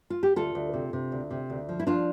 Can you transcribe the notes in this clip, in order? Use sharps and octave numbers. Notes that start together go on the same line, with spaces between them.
F4
G4
D2 F4 A4
D2
C3
C3
D2
C3
D2
F3
E4
F3 D4 F4